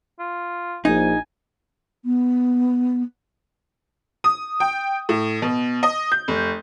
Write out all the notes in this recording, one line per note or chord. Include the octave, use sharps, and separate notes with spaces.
F4
A#1 D#4 G#5
B3
D#6
G5
A2
B2
D#5
G6
F1